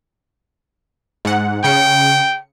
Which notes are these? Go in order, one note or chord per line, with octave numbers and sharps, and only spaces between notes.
G#2 F#5
C#3 G5 C#7